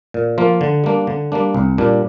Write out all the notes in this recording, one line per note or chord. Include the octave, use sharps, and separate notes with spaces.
A#2
F3 A#3 F4
D3
G3 A#3 D4
D3
G3 A#3 D4
C2
A#2 G3 D4